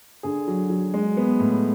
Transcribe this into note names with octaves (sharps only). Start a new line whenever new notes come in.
D3 G#4
F#3
F#3
G#3
B3
A2